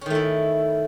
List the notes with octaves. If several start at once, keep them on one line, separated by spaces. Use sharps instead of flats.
D#3 A3 C#4 E4